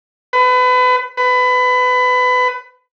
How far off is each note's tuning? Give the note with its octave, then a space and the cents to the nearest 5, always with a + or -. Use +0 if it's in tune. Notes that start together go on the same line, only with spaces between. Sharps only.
B4 +30
B4 +25